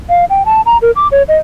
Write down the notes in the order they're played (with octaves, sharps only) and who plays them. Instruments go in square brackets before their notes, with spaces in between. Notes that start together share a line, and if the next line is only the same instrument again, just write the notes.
[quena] F5
G5
A5
A#5
A#4
D6
C#5
D#5